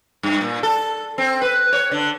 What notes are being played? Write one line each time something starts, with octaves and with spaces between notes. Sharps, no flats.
G2
A#2
A4
C4
B4
C#5
D3